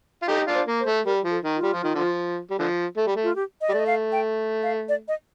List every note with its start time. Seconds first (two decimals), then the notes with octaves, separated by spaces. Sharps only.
0.22 F4
0.28 D#4 G4 A4
0.47 D4 F4
0.54 C5
0.67 A#3
0.80 C5
0.86 A3
1.05 G3 A#4
1.24 F3
1.30 A4
1.43 D#3
1.56 F4
1.63 G3
1.73 F3
1.84 D#3
1.95 D3 F3
2.50 G3
2.59 D3 F3
2.97 A3
3.07 G3
3.16 A3
3.23 F4
3.36 G4
3.61 D#5
3.69 G3
3.72 A3 D5
3.79 D#5
3.87 F5
4.12 G5
4.63 F5
4.89 D5
5.08 D#5